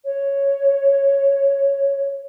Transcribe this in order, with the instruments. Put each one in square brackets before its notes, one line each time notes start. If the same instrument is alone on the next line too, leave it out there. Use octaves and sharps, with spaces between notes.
[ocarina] C#5